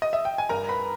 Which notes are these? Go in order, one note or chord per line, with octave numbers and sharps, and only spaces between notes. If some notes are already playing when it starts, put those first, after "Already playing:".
D#5
E5
G5
G#5
G2 A#4 A#5
B4 B5